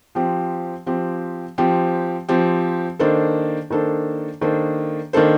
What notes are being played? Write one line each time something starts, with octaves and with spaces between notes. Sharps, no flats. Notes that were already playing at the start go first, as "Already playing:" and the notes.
F3 C4 G4
F3 C4 G4
F3 C4 G4
F3 C4 G4
D#3 A#3 D4 A4 C5
D#3 A#3 D4 A4 C5
D#3 A#3 D4 A4 C5
D#3 A#3 D4 A4 C5